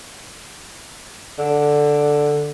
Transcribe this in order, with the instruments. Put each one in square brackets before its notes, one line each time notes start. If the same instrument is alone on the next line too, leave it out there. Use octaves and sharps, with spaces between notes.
[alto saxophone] D3